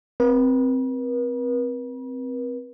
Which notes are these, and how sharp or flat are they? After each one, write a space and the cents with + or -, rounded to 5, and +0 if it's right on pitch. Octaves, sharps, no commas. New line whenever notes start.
C4 -5 B4 -45